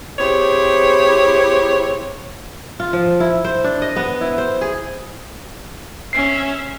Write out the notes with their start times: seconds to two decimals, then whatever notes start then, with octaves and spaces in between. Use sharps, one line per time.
0.19 C4 E4 G4 G#4 C5 C#5
2.80 F4
2.93 F3
3.20 E4
3.45 C5
3.64 D4
3.82 D#5
3.96 B3
4.21 E4
4.38 C5
4.61 G#4
6.13 C#4 E5 C7